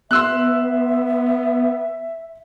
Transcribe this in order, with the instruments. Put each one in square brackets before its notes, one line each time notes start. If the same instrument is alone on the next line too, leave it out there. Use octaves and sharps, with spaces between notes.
[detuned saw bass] B3 [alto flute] E5 [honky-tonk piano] C6 E6 F#6